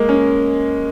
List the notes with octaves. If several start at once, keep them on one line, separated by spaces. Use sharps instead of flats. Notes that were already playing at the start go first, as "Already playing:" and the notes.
Already playing: G#3 A#3
C#4